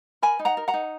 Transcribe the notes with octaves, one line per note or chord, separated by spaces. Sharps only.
A#4 G#5 B5
D#4
F#5 A#5
A#4
F#5 A#5
D#4